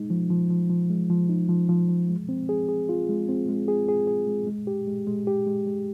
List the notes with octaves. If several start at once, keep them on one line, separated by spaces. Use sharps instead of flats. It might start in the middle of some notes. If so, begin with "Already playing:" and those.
Already playing: G#3 D#4
F3
F3
F3
F3
G#3
F3
D#4
F3
F3
F3
G#3
C4
G#4
G#4
F4
G#3
C4
G#3
G#4
G#4
G#4
G#3
G#3
G4
G#3
G#3
G4
G#3
G#3